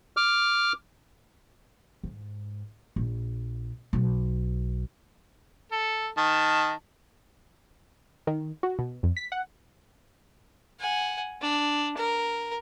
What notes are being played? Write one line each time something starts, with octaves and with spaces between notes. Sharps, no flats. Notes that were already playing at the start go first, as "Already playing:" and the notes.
D6 F6
G#2
A#1
B1
A4
D#3 A5
D#3
F#4
B2
F2
B6
F#5
F#5 G#5
D4
A#4